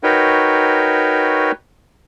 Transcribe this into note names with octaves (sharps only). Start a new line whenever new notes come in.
D#4 F#4 A#4 B4 C#5 G5